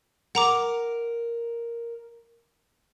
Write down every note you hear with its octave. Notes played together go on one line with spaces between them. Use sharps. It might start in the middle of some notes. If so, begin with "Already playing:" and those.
A#4 F#5 A#5 D6